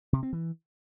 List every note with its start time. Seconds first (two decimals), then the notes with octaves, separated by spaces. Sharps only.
0.13 C3
0.23 C4
0.33 E3